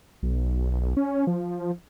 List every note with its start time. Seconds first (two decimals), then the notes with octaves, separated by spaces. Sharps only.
0.23 B1
0.97 C#4
1.27 F3